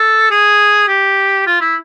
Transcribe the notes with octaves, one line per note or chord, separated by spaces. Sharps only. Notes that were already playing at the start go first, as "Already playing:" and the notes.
Already playing: A4
G#4
G4
F4
E4